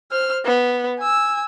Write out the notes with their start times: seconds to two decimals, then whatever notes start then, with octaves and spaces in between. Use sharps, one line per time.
0.11 C5 F6
0.45 B3
0.99 G#5 E6